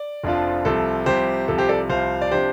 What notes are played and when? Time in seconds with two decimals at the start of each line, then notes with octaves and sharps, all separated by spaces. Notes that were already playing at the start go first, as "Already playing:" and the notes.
Already playing: D5
0.24 F1 F2 F3 D4 F4
0.65 C2 C3 F3 A4
1.06 C2 C3 F3 G4 C5
1.48 C2 C3 F3 A4
1.58 G4 C5
1.69 A4 D5
1.89 C2 C3 F3 C5 F5
2.22 D5
2.31 C3 F3 D4 G4 C5